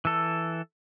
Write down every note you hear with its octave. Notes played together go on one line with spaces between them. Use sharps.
E3 A4